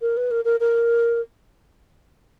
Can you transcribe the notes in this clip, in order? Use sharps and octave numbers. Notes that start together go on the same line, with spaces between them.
A#4
B4
A#4
A#4
A#4